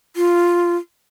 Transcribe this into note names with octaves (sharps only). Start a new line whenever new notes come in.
F4